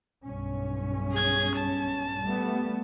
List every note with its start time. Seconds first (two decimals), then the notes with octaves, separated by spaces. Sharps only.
0.25 B1 G2 C#4
1.12 G#4 G#6
1.56 A5
2.22 G3 A3 B3